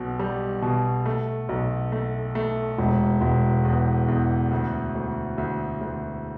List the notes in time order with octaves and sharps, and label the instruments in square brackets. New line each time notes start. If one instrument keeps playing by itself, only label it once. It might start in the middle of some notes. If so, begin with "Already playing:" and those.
Already playing: [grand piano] B1 B2
G3
B2
A3
B1
A3
A3
E1
E1
E2
E2
D2
D2
D2
D2